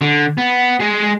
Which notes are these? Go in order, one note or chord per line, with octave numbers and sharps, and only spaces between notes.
D3
B3
G#3 G#4